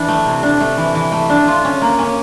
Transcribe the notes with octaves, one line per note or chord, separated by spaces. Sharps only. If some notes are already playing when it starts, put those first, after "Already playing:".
Already playing: E3 D4
A3
C3
D4
A3
E3
E3
A3
D4
F4
C#4
A#3
C#4